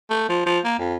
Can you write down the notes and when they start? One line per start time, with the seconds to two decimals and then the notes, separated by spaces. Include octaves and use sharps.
0.10 A3
0.29 F3
0.46 F3
0.64 A#3
0.79 F2